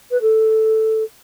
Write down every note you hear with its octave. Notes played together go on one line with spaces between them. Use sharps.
B4
A4